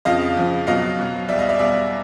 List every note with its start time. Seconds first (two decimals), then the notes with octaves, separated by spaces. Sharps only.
0.05 F2 C#3 F3 D#5 F5
0.37 F2 C#3 F3
0.67 B2 F#3 D#5 F5
0.99 B2 F#3
1.28 E2 B2 G3 D5 E5
1.39 D#5 F5
1.49 D5 E5
1.59 E2 B2 G3 D5 E5